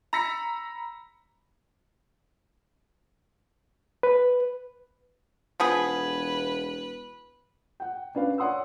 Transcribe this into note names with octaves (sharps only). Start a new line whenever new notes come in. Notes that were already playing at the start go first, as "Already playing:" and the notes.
A#5 B5 E6 A#6 B6 C#7
B4
E1 F3 B3 G#4 B4
F#5 G5
C#4 D4 B4 F5
C#5 D5 F#5 C6 D#6 E6